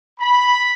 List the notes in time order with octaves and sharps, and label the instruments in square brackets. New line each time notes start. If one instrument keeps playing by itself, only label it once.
[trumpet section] B5